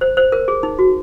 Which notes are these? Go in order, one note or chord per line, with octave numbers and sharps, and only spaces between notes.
C5
C5
A#4
G#4
D#4
F#4